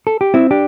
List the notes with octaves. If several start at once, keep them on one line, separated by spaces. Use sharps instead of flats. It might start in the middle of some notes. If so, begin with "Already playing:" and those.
A4
G4
C4 E4
D4 G4